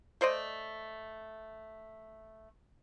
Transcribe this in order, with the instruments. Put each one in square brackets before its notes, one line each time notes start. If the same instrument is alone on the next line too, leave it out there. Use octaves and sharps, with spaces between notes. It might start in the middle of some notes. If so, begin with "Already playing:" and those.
[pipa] A3 C5 D5 D#5